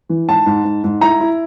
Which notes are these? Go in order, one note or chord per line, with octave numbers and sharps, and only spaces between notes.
E3
G#2 A5
G#2
G#2
G#2
E4 A#5
E4